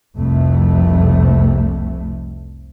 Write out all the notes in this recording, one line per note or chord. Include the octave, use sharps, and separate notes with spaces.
F1 C2 F2 C3 A3